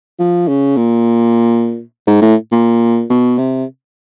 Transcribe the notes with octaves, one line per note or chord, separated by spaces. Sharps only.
F3
C#3
A#2
G#2
A2
A#2
B2
C3